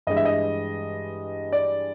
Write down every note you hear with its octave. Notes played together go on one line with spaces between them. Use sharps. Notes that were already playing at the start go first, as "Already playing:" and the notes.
G2 E3 G#3 D#5
E5
D#5
D5